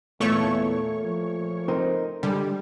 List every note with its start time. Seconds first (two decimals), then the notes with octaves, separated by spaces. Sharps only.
0.20 E2 A#2 A3 C#5 C#6
1.05 F3
1.68 C4 D#4 A#4
2.23 D3 G3 G#3